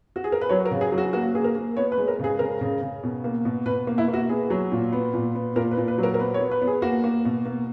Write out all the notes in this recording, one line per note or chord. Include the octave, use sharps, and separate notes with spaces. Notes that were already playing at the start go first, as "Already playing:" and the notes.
F#4
G#4
A#4
B4
F#3 C#5
A#4
C#3
G#4
F#3
F#4
A#3 F#4
A#3 G#4
A#4
A#3
B3 C#5
B4
G#3
A#4
C#3 G#4
C#3 A#4
C#3
C#3
B2
A#3
B2
B2 B4
A#3
E4
A#3
F#4
B3 G#4
F#3
A#2
B3
A#2
B3
A#2 A#4
B4
A#2
B4
F#3
A#4
A#4
B3 B4
C#5
B3
B4
B3
G#4
A#3 F#4
A#3
B2
A#3